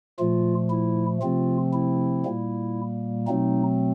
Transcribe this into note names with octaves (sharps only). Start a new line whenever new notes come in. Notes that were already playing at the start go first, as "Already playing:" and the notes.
A#2 F3 A3 F4
E4
C3 F3 A3 C4 F4
E4
A#2 G3 A#3
B2 F#3 A3 C4 D#4